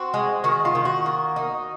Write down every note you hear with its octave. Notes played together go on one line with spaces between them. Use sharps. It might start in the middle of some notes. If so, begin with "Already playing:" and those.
Already playing: C4 F#4
G#3
D#3 F#4
F4
D#3
F#4
A#3
D#4